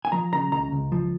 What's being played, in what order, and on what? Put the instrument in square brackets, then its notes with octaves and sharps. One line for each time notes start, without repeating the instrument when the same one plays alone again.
[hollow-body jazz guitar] G#5
F3 A#5
C#3 A#5
C#2 A#5
C#2
F3